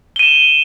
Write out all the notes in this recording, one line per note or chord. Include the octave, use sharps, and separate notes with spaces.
D#7 E7 G7